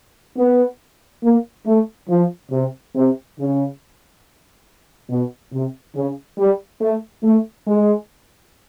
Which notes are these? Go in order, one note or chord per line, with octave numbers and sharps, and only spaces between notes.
B3
A#3
A3
F3
C3
C3
C#3
B2
C3
C#3
G3
A3
A3
G#3